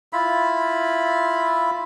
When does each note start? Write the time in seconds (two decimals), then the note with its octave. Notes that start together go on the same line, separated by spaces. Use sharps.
0.13 E4 F4 B5